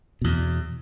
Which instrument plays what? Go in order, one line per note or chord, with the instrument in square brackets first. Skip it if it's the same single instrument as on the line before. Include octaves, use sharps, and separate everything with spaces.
[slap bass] E2 B2